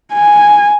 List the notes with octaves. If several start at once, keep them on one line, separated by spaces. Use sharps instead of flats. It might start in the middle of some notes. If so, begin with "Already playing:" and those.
G#5